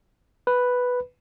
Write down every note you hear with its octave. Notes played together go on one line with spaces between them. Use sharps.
B4